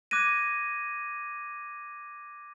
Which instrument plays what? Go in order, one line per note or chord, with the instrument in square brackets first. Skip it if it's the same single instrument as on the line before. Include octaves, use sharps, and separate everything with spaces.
[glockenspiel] D6 F#6 G#6 A#6 D#7